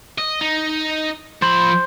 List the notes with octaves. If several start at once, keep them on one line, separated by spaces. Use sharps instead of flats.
D#5
D#4
F3 C5 B5